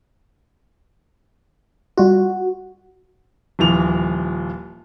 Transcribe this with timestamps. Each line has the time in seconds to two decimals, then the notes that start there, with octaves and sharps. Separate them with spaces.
1.97 G3 F4 F#4
3.59 D#1 E3 F3 F7